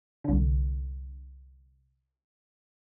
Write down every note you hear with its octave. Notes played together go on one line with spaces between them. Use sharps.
C2 D3